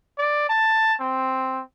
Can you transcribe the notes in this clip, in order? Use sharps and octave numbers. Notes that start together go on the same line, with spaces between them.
D5
A5
C4